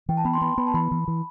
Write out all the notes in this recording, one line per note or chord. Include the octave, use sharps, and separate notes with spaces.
E3 G5
A5
B3 B5
C6
B3 B5
C6
B3 B5
A5
E3 B5
E3
E3